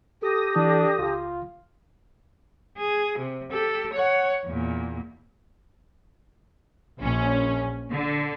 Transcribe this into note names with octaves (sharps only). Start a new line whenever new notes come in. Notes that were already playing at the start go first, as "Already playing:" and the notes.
G4 A4 D#6 A#6
E3 D4
C#2 F4 F5
G#4
C3
G4 A4
C#5 F#5
E2 A#2
A#1 C#4
D3